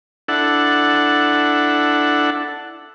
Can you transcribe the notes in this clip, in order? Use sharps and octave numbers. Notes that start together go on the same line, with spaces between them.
D4 E4 A4 F#5